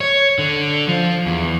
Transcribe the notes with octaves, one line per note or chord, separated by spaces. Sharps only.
C#5
D3
F3
E2